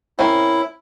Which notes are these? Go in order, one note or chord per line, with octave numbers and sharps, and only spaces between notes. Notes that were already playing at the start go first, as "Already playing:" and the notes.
C4 C#4 E4 A#4